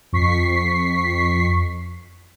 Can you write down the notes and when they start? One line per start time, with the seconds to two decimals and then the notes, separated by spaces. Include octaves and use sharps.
0.13 F2 C#6 B6 C7